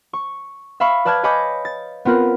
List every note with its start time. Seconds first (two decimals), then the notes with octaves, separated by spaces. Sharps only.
0.13 C#6
0.80 E5 F5 B5 C#6
1.05 B4 D5 A5 F6 F#6 G#6
1.23 C#5 D#5 G#5 B5 D6 G6
1.65 A6
2.05 B3 C4 F4 A#4 B4